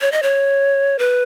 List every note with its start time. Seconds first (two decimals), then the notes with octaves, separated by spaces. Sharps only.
0.01 C#5
0.12 D#5
0.23 C#5
0.99 B4